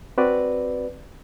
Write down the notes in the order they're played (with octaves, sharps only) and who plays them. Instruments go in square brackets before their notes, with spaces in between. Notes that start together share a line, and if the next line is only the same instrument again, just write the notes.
[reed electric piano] C4 F#4 B4 D5